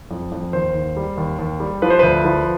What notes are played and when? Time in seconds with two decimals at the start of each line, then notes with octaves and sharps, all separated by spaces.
0.11 F2
0.32 F2
0.53 D#2 C5
0.75 D#2
0.97 G3
1.18 D#2
1.39 D#2
1.60 G3
1.82 F3 B4
1.90 C5
1.99 D2 B4
2.25 F3